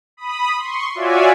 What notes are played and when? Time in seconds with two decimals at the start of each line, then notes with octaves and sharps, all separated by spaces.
0.17 B5 D#6
0.58 C6 C#6
0.95 F4 F#4 C#5 D5 E5 G#5